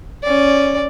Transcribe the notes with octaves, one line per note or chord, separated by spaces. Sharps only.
C#4 D5